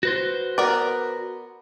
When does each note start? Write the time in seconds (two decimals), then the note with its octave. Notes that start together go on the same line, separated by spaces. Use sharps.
0.03 F#4 B4 C5
0.58 B3 A#4 D5